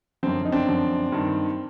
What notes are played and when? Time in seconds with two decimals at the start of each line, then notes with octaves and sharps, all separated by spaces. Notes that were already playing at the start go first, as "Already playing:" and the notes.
0.23 F#2 D3 F3 C4
0.45 D#4
0.52 C4 D4
0.67 F#2 D3 F3
1.12 G2 D#3